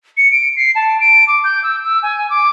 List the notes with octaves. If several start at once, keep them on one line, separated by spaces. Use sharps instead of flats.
C#7
D7
C7
A5
D7
D6
G6
E6
E6
G#5
D6